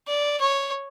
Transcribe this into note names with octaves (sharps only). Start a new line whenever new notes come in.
D5
C#5